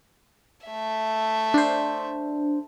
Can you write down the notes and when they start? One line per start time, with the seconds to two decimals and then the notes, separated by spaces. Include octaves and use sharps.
0.67 A3 E5
1.54 D4 C5